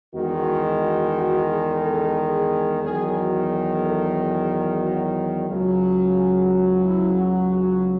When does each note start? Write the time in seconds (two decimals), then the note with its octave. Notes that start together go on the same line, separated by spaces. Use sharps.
0.13 E2 D#3 G#3 F#4
0.80 F#4
1.13 F#4
1.48 G#4
1.81 A4
2.15 G#4
2.81 E2 D#3 F#3 G#4
3.15 F#4
3.48 G#4
3.82 A4
4.16 G#4
4.48 G#4
4.82 F#4
5.49 C#2 C#3 F#3
6.16 G#4
6.49 F#4
6.83 E4
7.17 F#4
7.50 F#4